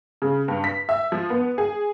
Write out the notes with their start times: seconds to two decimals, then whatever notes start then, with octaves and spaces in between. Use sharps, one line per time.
0.22 C#3
0.48 G2
0.64 B6
0.89 E5
1.12 F3
1.30 B3
1.58 G#4